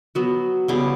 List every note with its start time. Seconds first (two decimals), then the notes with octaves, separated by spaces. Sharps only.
0.15 F#3 B3 F#4
0.68 C#3 G3 B3 E4